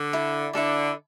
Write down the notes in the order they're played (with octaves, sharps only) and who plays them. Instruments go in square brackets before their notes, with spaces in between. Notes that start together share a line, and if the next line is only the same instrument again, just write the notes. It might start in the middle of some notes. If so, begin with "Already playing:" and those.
Already playing: [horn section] D3
[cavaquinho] E4 A4 D5
[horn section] D3 [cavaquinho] E4 A4 D5